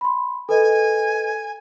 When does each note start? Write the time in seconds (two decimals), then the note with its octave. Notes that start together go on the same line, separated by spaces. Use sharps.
0.01 B5 C6
0.49 A4 B4 D#5 G#5